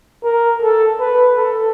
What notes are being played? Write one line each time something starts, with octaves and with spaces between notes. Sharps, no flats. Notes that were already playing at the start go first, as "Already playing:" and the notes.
A#4
A4
B4
A4